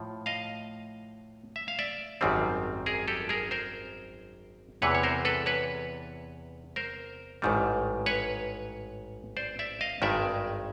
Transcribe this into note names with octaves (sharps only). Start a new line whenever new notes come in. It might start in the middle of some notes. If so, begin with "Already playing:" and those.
Already playing: A2 F3
D#5 F5
E5
F5
D5 E5
G#1 F#2 D#3 G3 C4
G#4 A#4
G4 A4
G#4 A#4
A#4 C5
E2 C3 E3 B4 C#5
C#5
A#4 C5
A4 B4
B4 C#5
A#4 C5
A1 G#2 D#3 G3
B4 C#5
C5 D5
D5 E5
D#5 F5
G#1 G2 D#3 G#3 D5 E5